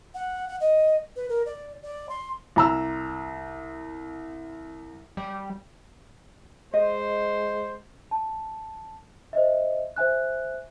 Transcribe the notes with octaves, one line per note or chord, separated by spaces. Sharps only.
F#5
F#5
D#5
B4
A#4
D5
D5
C6
C2 A#5 E6
G3
G#3 C5 D#5
A5
C5 D#5 E5
C5 E5 G#5 F#6